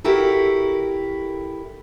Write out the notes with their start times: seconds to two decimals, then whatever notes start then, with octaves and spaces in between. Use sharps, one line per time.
0.04 E4 F#4 G4 A4 A#4